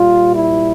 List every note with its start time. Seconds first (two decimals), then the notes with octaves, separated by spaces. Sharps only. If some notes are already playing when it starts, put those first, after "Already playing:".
Already playing: A#2 G3 F4
0.32 E4